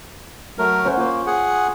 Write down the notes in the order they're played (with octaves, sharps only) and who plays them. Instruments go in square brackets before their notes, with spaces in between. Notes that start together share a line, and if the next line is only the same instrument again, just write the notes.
[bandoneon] F#3 A3 A#4
[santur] C#4 C5 F#5
[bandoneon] A#3 [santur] F4 C5
[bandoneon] G#4 F#5